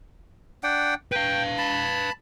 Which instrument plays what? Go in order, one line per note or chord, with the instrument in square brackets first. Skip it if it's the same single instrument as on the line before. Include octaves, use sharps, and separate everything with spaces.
[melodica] D4 F#5 G5
[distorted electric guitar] B4 F5 [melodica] G5
[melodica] A5 B5